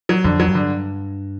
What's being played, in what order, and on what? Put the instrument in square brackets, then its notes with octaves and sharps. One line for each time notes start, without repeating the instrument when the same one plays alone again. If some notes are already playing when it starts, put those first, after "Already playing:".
[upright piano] F#3
[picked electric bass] F2 [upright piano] D3
[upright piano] F#3
[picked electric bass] G2
[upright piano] D3